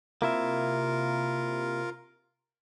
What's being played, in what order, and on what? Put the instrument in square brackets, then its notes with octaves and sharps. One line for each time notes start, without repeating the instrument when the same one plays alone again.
[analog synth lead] C3 [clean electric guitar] A#3 E4 E5 [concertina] F4 A#4